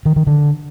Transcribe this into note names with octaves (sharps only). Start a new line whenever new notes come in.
D#3
D#3
D3